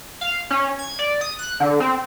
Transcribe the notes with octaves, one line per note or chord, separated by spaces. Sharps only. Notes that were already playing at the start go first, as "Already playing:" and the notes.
F5
C#4
G#6
D5
D#6
F#6
D3
C4